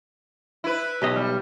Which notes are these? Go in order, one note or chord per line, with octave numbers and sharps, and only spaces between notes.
E4 B4
B1 G4 D#5
G3